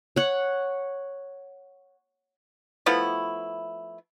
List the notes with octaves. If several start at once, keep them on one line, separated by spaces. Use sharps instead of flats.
C#5 F#5
F3 A3 B3 E4